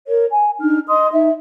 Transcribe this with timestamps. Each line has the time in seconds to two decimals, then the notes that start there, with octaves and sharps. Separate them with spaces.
0.08 A#4 C#5
0.32 G#5
0.60 D4 D#4 F6
0.87 D#5 C6 D#6
1.12 D#4 E5